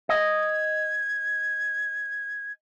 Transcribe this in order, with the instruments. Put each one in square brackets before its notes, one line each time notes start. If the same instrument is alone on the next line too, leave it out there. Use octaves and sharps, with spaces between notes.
[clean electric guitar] D#5 [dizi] G#6